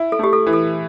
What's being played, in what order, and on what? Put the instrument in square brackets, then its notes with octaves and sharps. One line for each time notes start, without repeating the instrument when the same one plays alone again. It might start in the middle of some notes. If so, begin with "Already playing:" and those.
Already playing: [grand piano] E4
[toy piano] A4
[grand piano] A3 [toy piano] G4
[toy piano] A4
[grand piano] E3
[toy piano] A4